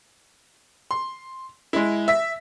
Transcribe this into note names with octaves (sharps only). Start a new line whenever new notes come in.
C6
G#3 E4
E5 B6